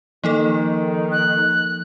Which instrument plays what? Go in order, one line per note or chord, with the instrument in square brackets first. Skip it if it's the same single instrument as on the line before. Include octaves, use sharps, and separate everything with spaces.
[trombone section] D#3 [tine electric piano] F3 [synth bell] A#3 D#4 A4
[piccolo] F#6